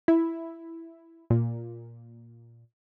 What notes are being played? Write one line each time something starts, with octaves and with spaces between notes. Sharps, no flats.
E4
A#2